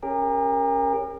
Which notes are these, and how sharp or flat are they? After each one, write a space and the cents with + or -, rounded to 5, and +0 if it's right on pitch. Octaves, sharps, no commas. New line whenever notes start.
C#4 +0 G4 +45 A#4 +0